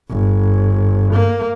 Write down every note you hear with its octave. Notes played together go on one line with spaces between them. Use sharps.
G1
A#3